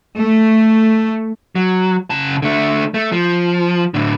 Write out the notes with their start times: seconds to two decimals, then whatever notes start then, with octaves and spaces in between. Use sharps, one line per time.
0.21 A3
1.55 F#3
2.10 C#3 A5
2.42 D3 A3
2.94 A3
3.12 F3
3.94 A2 D3